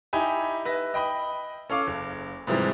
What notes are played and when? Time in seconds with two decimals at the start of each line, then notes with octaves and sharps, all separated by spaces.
0.13 D#4 E4 G4 G#5 B5
0.65 B4 E5 A#6
0.94 D#5 G5 B5 D#6
1.70 C#4 A4 F5 D6
1.87 F#1
2.47 G#2 C3 E3 F3 G3 G#3